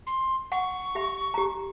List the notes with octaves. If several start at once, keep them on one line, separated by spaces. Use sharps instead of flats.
C6
F#5 C#6
G4 E5 B5
G4 A#5